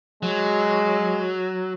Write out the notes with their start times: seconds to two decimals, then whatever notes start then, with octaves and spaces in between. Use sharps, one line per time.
0.23 F#3 G#3